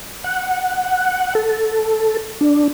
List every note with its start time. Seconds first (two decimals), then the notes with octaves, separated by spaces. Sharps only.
0.24 F#5
1.35 A4
2.41 D4